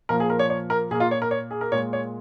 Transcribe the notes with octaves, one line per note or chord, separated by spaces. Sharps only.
A#2 F3 A#3 A#4
G#4
A#4
C#5
C#5
A#4
A#2 A#3 G#4
F4
C#5
A#4
C#5
G#4
A#4
A#2 G#3 C#5
C#5